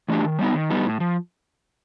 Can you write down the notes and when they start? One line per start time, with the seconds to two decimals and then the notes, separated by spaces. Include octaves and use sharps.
0.08 E3 A3 D4 G4
0.24 D#3
0.39 G3 B3 D#4
0.54 D#3
0.70 G3 B3 D#4
0.85 A2
1.00 F3